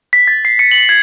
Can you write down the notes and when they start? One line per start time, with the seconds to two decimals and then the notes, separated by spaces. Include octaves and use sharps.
0.13 B6
0.27 A6
0.45 C7
0.59 C#7
0.71 F#7
0.89 G#6